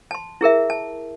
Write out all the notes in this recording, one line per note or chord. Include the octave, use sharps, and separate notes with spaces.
A5 C6
E4 G#4 A#4 E5
A5